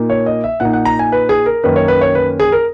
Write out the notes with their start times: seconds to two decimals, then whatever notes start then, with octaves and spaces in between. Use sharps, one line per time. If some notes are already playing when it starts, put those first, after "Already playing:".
Already playing: A#2 A#3 D#4
0.10 C#5
0.26 D#5
0.44 E5
0.60 A#2 A#3 D#4 F#5
0.73 F#5
0.85 A#5
0.99 G#5
1.12 B4
1.29 G#4
1.46 A#4
1.64 F#2 D#3 A#3 C#4 B4
1.76 C#5
1.88 B4
2.01 C#5
2.15 B4
2.40 G#4
2.52 A#4